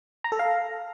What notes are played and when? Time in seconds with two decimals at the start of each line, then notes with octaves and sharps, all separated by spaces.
0.24 A#5
0.32 A4
0.39 F5